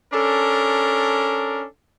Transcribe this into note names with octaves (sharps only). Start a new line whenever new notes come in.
C#4 D4 A4 A#4